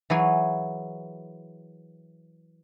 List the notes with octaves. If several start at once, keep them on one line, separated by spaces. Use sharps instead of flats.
E3 F#3 G#4